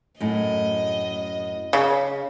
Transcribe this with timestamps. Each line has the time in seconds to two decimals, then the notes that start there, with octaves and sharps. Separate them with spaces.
0.20 F#2 A2 D#5
1.73 C#3